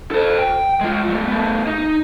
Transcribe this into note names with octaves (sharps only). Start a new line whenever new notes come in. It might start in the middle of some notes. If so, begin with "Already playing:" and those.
A4 C5
G5
G#3 F4
F#3 A3
A3 B3
D#4